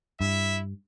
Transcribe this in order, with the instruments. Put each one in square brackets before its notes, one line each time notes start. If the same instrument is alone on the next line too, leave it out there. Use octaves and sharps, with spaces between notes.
[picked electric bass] G2 [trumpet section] E4 E5